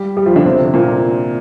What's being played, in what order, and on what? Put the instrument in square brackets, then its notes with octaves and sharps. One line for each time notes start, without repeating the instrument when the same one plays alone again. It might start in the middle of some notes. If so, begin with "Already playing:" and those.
Already playing: [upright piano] G3 G4
G3 G4
F3 F4
D3 D4
C3 C4
A#2 A#3